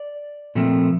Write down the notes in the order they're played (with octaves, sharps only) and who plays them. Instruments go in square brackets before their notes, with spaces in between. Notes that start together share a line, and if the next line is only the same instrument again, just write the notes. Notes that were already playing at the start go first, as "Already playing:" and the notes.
Already playing: [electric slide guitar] D5
A#2 F3 A3 C4